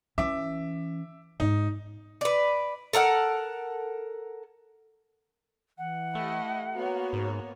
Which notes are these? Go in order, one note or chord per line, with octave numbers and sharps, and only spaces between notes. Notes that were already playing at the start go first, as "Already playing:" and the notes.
E3 C#4 E5 D6
G#2 D#4
B4 D5
A4 A#4 E5 F#5
E3 F#5
A3 E4 G4 D#5
A#3 B3 F#4 C#5
G#2